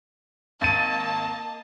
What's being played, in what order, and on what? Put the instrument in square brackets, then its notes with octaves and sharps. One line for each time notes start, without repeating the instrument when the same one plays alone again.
[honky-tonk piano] G#1 A6 D#7 [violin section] A#3 D#5 A5